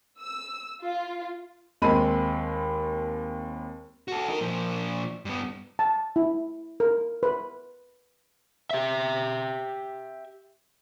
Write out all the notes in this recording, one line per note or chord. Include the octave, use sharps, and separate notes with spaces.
E6
F4
D#2 G#3 C4 A5 B5 D#7
F#4 A4
D#4 A#4
A#2 F3
G2 B3
A5
E4
A#4
B4
G4 E5